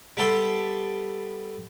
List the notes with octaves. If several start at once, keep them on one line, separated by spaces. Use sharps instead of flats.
G3 B3 G4 A4 C5 E5